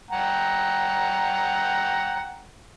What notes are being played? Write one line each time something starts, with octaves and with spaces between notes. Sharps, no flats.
F#5 G5 A#5